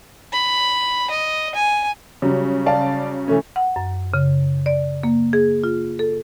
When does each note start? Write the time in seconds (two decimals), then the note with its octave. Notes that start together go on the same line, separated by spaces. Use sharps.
0.33 B5
1.11 D#5
1.55 G#5
2.22 C#3 F#3 G3
2.66 D5 F5 A5
3.28 E3 A3 C#4
3.56 F#5
3.76 F#2
4.14 C#3
4.66 D5
5.03 A#3
5.33 G#4
5.64 F4
5.99 A4